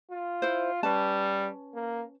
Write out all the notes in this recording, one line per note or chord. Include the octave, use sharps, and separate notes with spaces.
F4
E4 C5
G3 C#4 B4 A5
A#3